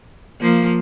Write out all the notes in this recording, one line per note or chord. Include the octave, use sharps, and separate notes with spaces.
F3 A#3